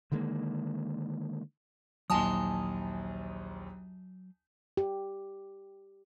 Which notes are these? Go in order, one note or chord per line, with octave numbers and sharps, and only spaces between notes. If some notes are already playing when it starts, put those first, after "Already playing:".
D3 D#3 G#3 A#3
A#1 D#2 F#3 D#5 G#5 A5 C6 D#6
G4